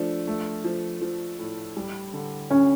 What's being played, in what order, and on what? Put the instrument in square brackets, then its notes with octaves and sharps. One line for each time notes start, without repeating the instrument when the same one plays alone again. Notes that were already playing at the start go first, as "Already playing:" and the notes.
Already playing: [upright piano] F3 A3 [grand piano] D4
[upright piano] A3
F3
F3
A2
G3
D3
[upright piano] D2 [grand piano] C#4